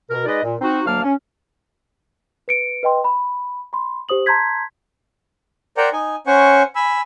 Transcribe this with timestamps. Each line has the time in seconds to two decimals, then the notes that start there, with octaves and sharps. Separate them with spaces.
0.10 B2 A#4
0.26 G#3 D#4 B4 D5 D#5
0.43 A#2
0.61 C4 D#4 F#4
0.86 D2 F#3 A#3 F5 A5 F6
1.03 C#4
2.48 B4 C#7 D7
2.83 B4 D#5 G5 C6
3.04 B5
3.73 B5 C6
4.09 G4 C5 D#6 F#7
4.26 A5 A#5 C6 G6 G#6 B6
5.77 A#4 C5 D5 F#5 G5 A#5
5.93 D#4 G#5
6.27 C#4 C5 F#5 G#5 C#6
6.75 G#5 B5 E6